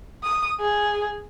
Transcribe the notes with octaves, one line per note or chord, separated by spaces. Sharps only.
D#6
G#4